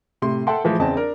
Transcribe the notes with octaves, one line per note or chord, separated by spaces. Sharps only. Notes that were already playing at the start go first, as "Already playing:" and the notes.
A2 C3 C6
A4 E5 F#5 G5 A5 C6
A2 E3 F3 G#3
E2 C#3 C4 D#5 A5
D4 A#4